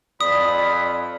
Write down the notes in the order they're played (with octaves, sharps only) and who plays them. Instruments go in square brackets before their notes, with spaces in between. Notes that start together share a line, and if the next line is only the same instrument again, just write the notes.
[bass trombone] F2 [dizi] D5 [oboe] B5 [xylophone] D#6